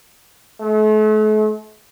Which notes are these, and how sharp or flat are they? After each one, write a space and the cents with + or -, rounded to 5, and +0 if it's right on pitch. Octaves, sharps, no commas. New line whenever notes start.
A3 -40